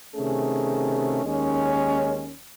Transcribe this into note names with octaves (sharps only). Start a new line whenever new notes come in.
C3 D#3 A3 C#4 G#4
D#2 D#3 G#3 C#4